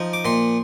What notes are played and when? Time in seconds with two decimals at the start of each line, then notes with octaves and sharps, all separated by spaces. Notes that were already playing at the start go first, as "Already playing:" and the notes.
Already playing: F3 D#4
0.13 D6
0.25 A#2 C6